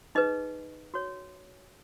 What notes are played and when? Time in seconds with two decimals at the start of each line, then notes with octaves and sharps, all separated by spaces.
0.15 D#4 G#4 B4 D#5
0.94 F#4 C#5